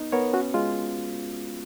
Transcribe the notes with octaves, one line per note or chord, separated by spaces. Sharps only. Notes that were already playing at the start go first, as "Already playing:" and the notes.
Already playing: B3 D#4
B3 A#4 C#5
C#4 F#4
G#3 F4